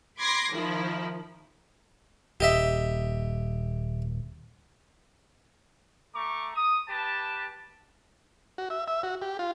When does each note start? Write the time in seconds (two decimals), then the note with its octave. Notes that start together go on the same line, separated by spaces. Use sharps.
0.18 B5 C6 D6 G#6 A#6 C7
0.51 D#3 F3 E4
2.40 D#1 G4 D#5 E5
6.15 A3 A#5 C#6 D6
6.55 D#6
6.88 G4 B4 A5
8.58 F#4
8.70 E5
8.88 E5
9.03 F#4
9.22 G4
9.39 F4